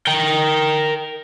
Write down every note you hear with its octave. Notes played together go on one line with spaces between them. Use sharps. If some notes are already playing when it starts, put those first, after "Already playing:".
A#4 G5